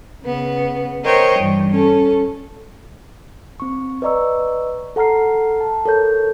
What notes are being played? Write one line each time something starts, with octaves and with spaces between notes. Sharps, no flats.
C#3 B3
A#4 C5 C#5 D#5 G5
G2 E3
C#4 A4
C4 C#6
B4 D5 D#5 A#5 C#6 E6
A4 F#5 A#5 F6 C7
A5
A4 A#4 C#5 G6